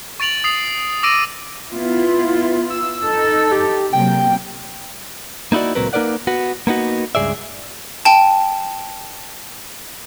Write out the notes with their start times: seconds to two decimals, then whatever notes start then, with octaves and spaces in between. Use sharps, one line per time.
0.20 C#6 A6 D7 F7 F#7
0.44 D#6 C7 F7
1.03 D6 E6 A#6 D7 D#7
1.71 B3 E4 F4
2.70 E6
3.04 D#4 A4
3.52 G4
3.93 C3 F#3 A#3 G5
5.52 A#3 D#4 E4 F#4 D5
5.75 C#2 A#2 F#3 C4 A#4 B4
5.93 A#3 D#4 A#4 B4 D5 F#5
6.27 B3 F#4
6.67 A#3 B3 D#4 F#4
7.15 C#2 G2 C#3 G#4 D5 E5
8.05 G5 A5